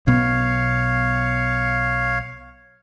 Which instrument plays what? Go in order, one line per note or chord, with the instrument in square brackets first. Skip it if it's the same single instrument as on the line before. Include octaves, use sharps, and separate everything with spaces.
[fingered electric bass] B1 B2 B3 [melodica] C#5 F5